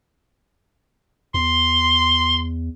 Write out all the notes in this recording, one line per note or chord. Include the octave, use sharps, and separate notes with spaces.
E2 C6